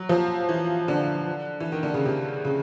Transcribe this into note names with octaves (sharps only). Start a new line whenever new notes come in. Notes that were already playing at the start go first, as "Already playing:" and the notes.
Already playing: F#3
F3
E3
D3
E3
D#3
D3
C#3
C3
C#3